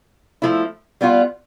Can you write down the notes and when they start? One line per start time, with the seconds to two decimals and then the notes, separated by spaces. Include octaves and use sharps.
0.42 F3 A3 E4
1.01 G3 B3 F4